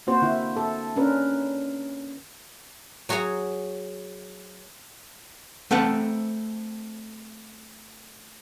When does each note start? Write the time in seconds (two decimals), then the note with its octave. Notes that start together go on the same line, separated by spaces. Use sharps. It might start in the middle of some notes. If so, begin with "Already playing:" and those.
0.07 A#3 C4 F#4 C5
0.22 D3 E4
0.56 A4
0.96 C#4 D4 A#4 B4
3.09 F#3 F#4 G#4 C#5 A#5
5.71 A3 C4 A4 B4 F#5